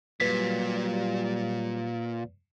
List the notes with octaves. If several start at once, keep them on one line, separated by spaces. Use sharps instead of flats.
A#2 F#3 G3 B4 B6